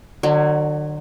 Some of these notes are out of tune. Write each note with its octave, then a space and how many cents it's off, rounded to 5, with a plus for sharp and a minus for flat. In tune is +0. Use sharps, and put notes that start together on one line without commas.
D3 +40 F#3 +0